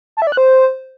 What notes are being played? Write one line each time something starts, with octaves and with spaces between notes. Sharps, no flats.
A5
E5
D5
F#6
C5